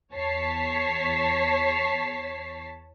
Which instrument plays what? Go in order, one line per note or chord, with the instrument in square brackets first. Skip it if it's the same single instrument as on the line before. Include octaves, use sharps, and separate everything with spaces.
[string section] E2 C#5 A5 B6 C7